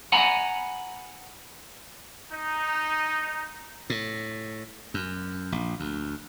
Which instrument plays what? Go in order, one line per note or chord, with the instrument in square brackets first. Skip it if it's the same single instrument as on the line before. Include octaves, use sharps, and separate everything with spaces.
[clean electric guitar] F#5 G#5 A#5 B5
[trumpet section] D#4
[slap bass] A2
F#2
A#1
D2